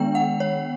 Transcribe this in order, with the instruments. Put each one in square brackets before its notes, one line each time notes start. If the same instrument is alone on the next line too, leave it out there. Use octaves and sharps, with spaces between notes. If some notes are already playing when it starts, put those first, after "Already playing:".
Already playing: [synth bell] D#3 G#3 B3 D4 G5
F#5
C#5